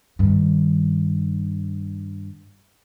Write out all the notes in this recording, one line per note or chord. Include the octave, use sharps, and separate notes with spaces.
G2 D#3